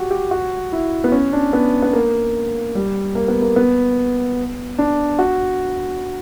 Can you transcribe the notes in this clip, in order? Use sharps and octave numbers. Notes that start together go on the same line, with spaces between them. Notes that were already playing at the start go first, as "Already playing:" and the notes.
Already playing: F#4 G4
G4
F#4
E4
B3
C#4
D4
B3
B3
A#3
G3
A#3
B3
A#3
B3
D4
F#4